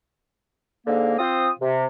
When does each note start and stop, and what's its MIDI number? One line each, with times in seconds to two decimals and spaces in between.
0.87 1.14 44
0.87 1.14 50
0.87 1.14 58
1.19 1.49 60
1.19 1.49 65
1.19 1.49 72
1.19 1.49 87
1.60 1.86 48